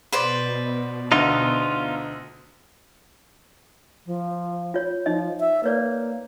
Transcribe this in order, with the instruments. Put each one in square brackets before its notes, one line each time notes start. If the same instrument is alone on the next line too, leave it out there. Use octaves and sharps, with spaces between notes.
[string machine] B2 [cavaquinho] B4 C5 D5
[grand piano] D2 D3 [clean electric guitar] D#4 F4
[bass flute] F3
[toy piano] F4 C#5
[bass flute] F3 [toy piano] D#4 D#5
[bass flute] E5
[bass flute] A#3 [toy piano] B4 C#5 D5